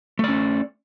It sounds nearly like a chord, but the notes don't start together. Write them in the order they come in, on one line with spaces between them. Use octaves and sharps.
A3 D5 C#4